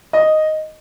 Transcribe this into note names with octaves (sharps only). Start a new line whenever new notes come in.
D#5